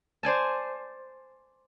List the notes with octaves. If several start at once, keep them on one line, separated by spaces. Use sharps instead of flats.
C5 D5 G#5 A5